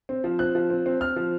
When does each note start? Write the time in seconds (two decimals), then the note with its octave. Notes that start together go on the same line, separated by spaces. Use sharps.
0.09 C4
0.24 F3
0.39 C4 F#6
0.55 F3
0.70 C4
0.86 C4
1.00 C4 F6
1.16 F3